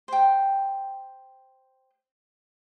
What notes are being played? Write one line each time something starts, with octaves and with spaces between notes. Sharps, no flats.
C5 G5